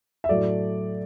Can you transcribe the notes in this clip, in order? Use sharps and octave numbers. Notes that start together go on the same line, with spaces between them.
E5
A2 F#3 A3 D5